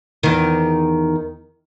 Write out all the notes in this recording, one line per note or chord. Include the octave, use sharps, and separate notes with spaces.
E2 D#3